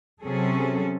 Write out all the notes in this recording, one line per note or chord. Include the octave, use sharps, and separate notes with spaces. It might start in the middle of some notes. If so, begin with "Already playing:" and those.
C3 F#3 C#4 G#4 A4